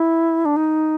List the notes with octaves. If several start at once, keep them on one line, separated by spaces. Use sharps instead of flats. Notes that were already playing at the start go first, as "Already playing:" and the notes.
Already playing: E4
D4
D#4